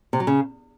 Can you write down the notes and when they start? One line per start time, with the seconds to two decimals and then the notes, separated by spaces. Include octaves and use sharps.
0.13 C3
0.20 F#3
0.27 C#3